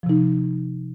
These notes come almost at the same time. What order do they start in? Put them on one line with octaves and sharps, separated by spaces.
F3 C3 D#4